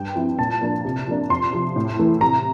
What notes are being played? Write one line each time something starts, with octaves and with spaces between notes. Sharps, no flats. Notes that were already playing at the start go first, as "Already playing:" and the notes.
Already playing: G2 G5
F3 C4 E4
A#2 A5
F3 A#3 D4
C3
F3 A#3 D4
F2 C6
C3 F3
A2
E3 A3 E4
C3 A#5